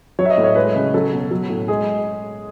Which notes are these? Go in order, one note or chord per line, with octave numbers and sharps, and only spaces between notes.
F#3 C#5
E5
D#5
A2
C#5
G#3 B4
C#3
F#3 A4
B2
F#3
A2
G#3 G#4